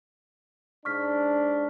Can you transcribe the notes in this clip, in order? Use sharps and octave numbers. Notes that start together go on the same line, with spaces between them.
G#2 D4 C#6 F6 B6